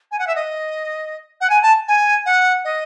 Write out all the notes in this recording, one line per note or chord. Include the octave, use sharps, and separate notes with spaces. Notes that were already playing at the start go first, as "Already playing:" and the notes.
G#5
F#5
E5
D#5
F#5
G#5
A5
G#5
F#5
D#5